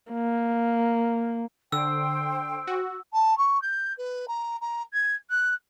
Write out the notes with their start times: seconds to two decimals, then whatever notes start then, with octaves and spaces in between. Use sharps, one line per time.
0.12 A#3
1.72 D3 C5 G5 E6
2.67 F#4
3.13 A5
3.38 C#6
3.62 G6
3.98 B4
4.28 A#5
4.61 A#5
4.93 G#6
5.30 F#6